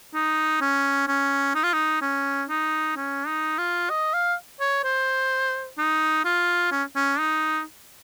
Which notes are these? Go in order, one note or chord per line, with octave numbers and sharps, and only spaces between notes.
D#4
C#4
C#4
D#4
F4
D#4
C#4
D#4
C#4
D#4
F4
D#5
F5
C#5
C5
D#4
F4
C#4
C#4
D#4